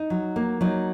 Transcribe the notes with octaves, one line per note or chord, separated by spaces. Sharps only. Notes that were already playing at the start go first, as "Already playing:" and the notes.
Already playing: D#4
F#3
A#3
F#3 D#4